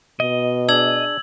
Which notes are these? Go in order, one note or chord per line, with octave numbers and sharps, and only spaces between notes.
B2 D#5
D4 G#4 E6 G#6 F#7